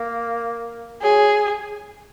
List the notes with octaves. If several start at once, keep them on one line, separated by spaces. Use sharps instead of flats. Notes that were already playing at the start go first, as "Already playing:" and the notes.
Already playing: A#3
F#3 G#4